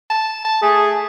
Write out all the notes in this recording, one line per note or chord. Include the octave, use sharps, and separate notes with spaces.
A5
A5
A3 G#4